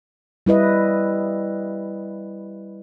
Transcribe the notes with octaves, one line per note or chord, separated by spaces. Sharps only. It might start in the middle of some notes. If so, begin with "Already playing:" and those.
G3 E4 B4 D#5